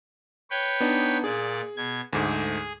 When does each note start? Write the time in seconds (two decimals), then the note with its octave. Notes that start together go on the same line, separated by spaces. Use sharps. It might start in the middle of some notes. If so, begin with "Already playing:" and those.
0.50 B4 C#5 G5
0.80 B3 D4 D#4
1.24 A#2 G#4 D5
1.77 B2 G#6
2.13 D2 G#2 A3 G#4